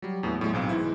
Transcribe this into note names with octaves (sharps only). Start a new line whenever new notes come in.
F#3 G3
E2 A2 B3
A2 F#3 G#3
B1 G#2 C4 F5
E3 G#3 E4